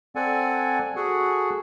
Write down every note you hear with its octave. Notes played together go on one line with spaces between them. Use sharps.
C4 A4 D5 F#5 G#5
F#4 G#4 A4 F#5